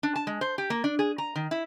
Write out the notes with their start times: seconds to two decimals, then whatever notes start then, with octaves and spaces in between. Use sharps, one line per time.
0.03 D4
0.16 A5
0.27 G#3
0.41 C5
0.58 G4
0.70 A#3
0.84 D4
0.99 G#4
1.18 A#5
1.36 D#3
1.51 E4